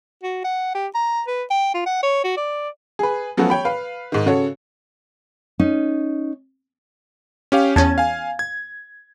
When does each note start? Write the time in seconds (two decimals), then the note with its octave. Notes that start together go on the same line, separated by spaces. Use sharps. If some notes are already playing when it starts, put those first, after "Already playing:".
0.23 F#4
0.44 F#5
0.75 G4
0.95 A#5
1.28 B4
1.50 G5
1.74 F4
1.86 F#5
2.03 C#5
2.24 F#4
2.37 D5
2.99 G#4 B4
3.37 F3 F#3 A3 B3 C#4 F#4
3.50 C#5 G5 B5
3.65 B4 F5
4.12 G#2 D#3
4.26 C#3 F#4 A4 C#5
5.59 C#4 D#4
7.52 C#4 G4 F5
7.76 E2 C#4 A5 G#6
7.98 F5 G#5
8.39 G#6